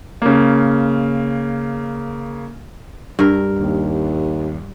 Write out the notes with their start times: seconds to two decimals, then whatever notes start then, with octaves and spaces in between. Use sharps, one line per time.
0.22 C#3 A#3
3.19 G2 A#4
3.59 D#2